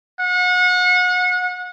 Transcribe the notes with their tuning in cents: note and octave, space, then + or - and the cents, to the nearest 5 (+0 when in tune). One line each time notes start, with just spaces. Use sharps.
F#5 -35